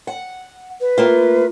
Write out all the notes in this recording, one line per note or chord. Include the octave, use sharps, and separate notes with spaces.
F#5
B4
A3 A#3 F4